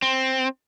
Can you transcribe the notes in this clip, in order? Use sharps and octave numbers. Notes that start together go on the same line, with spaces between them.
C4